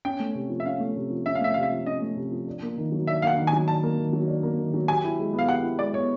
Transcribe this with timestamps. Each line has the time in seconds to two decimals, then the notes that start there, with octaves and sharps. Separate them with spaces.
0.05 C#4 G5
0.20 A3
0.35 C3
0.50 F3
0.60 E5
0.66 C#4 F5
0.80 A3
0.96 C3
1.10 F3
1.26 C#4 E5
1.35 F5
1.40 A3 E5
1.54 C3 F5
1.63 E5
1.71 F3
1.86 C#4 D#5
2.02 A3
2.16 C3
2.31 F3
2.47 D4
2.62 A#3
2.78 D#3
2.92 F#3
3.07 D4 E5
3.22 A#3 F5 F#5
3.38 D#3
3.47 G#5
3.53 F#3
3.67 D4 A5
3.83 A#3
3.97 D#3
4.13 F#3
4.28 D4
4.43 A#3
4.59 D#3
4.74 F#3
4.88 G4 G#5
5.04 E4
5.19 G#3
5.33 B3
5.39 F5
5.49 G4 F#5
5.63 E4
5.79 G#3 D5
5.94 B3 C#5